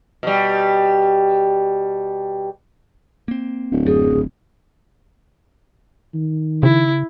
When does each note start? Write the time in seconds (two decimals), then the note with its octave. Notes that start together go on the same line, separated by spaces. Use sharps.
0.23 B2 G3
3.28 A#3 C4
3.72 D1
3.86 F#2 G#4
4.12 G#1
6.14 D#3
6.63 C#3 E4